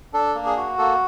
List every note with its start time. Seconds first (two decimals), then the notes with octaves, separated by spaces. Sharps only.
0.13 D4 A4
0.35 A#3
0.46 G#4
0.57 F#4
0.78 A#3 A4